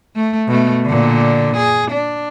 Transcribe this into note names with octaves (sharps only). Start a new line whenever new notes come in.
A3
B2 A3
A#2 D3
G#4
D4